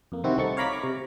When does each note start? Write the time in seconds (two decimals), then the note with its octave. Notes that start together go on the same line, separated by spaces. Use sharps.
0.12 F2 A#3
0.24 C3 D#3 C4 E4 F#4
0.37 C2 A3 D#4 C#6 A6
0.57 C#5 F5 A#5 B5 D6 B6
0.72 A#5 C#6 D6
0.83 C3